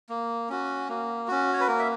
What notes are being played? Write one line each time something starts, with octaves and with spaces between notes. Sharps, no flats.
A#3
C#4 F#4
A#3
C#4 F#4
C#5
B4
A#3 A#4
E5